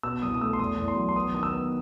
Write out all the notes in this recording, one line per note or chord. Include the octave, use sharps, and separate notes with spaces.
B2 E6
C2 D#6
D#6
A3 E6
C6
E2 D#6
E2
C6
F#3
C6
B3 D#6
D#3 D#6
E6
B3